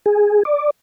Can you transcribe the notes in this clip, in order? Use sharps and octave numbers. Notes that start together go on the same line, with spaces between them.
G#4
D5